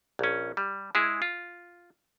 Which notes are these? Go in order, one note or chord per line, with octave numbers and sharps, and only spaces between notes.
A#1 C#4
G3
G#3 E4 G#4
F4